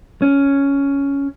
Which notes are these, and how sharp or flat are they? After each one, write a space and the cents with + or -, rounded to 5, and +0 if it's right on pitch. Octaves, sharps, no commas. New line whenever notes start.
C#4 +5